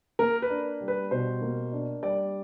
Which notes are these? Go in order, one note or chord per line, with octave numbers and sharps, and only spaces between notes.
A#3 A#4
B4
D4
G3
B4
B2 C5
A#3
D4
G3 D5